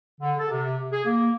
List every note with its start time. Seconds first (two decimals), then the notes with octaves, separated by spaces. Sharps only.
0.21 D3
0.38 A4
0.50 C3
0.91 G#4
1.05 A#3